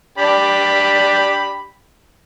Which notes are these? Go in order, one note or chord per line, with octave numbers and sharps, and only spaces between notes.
D4 G4 B5